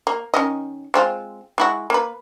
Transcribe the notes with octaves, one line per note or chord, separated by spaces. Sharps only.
A#3
D#3 C#4 D#5
G#3 C4 F4
G#3 E4 F#4
A#3 B4